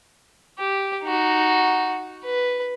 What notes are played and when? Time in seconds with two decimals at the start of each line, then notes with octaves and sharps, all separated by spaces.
0.59 G4
1.04 D#4 F#4
2.25 B4